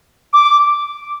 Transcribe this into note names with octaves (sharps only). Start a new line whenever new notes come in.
D6